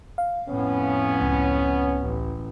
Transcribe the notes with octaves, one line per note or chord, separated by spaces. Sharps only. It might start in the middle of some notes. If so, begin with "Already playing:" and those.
F5
F2 A2 B3 C#4
C#2
A1